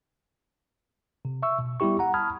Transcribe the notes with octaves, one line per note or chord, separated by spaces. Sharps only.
C3
E5 C#6 E6
B2
G3 B3 E4 G4 C#6
F#5 A#5
A5 B5 D#6 F6 G#6